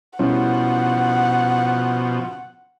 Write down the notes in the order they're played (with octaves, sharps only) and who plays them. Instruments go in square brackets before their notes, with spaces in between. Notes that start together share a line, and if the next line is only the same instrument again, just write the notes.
[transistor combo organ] B2 F3 [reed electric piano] G3 C#4 E4 [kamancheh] F#5